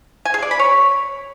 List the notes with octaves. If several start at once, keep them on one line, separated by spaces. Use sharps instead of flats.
G#5
G#4
D5
B5
C#5